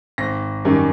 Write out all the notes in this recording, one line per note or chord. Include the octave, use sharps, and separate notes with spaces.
G#1 A#6
F#2 D#3 G3